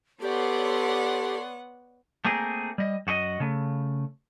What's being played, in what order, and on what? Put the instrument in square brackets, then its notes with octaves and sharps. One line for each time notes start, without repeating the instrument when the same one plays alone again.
[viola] B3 F#5 [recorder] G4 [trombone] A4 [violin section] C#5 D5 C6
[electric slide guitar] A3 A#3 C4 G#4 A#4
G3 D#5
F#2 F#4 G4 D#5
C#3 A3